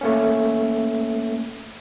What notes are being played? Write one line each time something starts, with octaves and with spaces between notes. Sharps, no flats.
A3 A#3 C#4